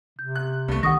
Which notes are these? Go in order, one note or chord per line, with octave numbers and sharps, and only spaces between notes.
C3 G6
F#6
C2 G2 A3
C3 D#3 F#5 C#6 D#6 A#6